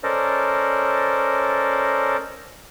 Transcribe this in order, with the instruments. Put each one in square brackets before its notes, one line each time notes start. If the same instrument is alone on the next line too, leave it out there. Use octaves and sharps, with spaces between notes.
[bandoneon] C#4 A4 A#4 C5 D5 D#5